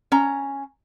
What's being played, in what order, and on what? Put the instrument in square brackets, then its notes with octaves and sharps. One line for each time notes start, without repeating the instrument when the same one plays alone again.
[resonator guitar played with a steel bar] C#4 A#5